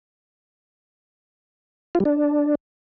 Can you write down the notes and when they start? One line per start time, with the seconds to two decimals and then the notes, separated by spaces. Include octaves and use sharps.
1.95 F4
2.00 G3
2.05 D4